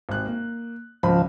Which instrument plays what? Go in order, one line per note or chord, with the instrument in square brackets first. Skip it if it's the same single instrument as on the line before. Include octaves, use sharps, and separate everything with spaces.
[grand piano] G#1 C3 F#6
A#3
[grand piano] G#1 C#2 B5 [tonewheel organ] F3